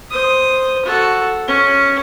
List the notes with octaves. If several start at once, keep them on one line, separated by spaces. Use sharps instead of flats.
C5 D#6
F#4 A4
C#4